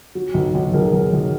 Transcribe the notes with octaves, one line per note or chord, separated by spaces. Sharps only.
F#3
B1
B1
B1 G#4 A#4
B1
B1